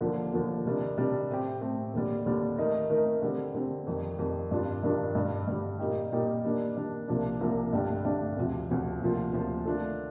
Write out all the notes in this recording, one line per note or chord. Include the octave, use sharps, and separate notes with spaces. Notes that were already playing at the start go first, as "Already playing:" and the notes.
D#2 D3 F3 A#3
D#2 D3 F3 A#3
C3 D#3 G3 D4
C3 D#3 G3 D4
A2 A3 C4 G4
A2 A3 C4 G4
D#2 D3 G3
D#2 D3 G3
D#3 A3 D#4 A#4
D#3 A3 D#4 A#4
D3 G3 C4
D3 G3 C4
F2 D#3 G3
F2 D#3 G3
G2 D#3 G3 D4 F4
G2 D#3 G3 D4 F4
G2 D3 G3
G2 D3 G3
A#2 G3 A#3 D#4 G4
A#2 G3 A#3 D#4 G4
D#3 G3 A#3 D4
D#3 G3 A#3 D4
C2 C3 F3 A#3 D4
C2 C3 F3 A#3 D4
G2 D3 A3 D4 G4
G2 D3 A3 D4 G4
D2 C3 F3
D2 C3 F3
D2 C3 F3 A#3 F4
D2 C3 F3 A#3 F4
D#3 A3 D4 F4 A4